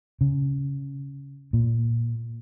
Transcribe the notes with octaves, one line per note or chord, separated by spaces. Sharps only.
C#3
A#2